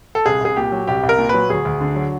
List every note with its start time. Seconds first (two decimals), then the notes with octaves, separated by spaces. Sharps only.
0.15 A4
0.26 C2 G#4
0.41 C2 G#4
0.56 A#2 G4
0.72 F#3
0.87 C2 G4
1.03 C2
1.09 A#4
1.18 A#2
1.29 F#3 B4
1.49 D2 G#4
1.65 D2
1.81 D3
1.96 F#3